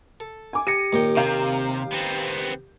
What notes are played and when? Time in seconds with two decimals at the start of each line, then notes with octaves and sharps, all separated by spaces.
0.20 A4
0.53 G#5 D6
0.67 G4 A#6 C#7 D#7
0.93 D#2 A#2 G4 A#4 G5
1.17 C3 F5 A#5 G6
1.92 B3 C4